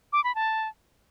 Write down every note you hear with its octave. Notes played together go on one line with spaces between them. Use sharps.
D6
B5
A5